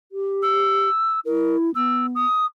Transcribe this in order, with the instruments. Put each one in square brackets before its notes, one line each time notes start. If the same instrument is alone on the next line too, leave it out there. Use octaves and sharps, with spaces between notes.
[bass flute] G4
[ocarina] E6
[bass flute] E4 [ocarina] A#4
[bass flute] B3 [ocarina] E6
[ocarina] D#6